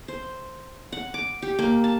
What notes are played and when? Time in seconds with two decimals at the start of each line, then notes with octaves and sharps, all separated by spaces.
0.08 C5
0.92 F#5
1.14 D6
1.42 G4
1.59 A#3
1.84 A5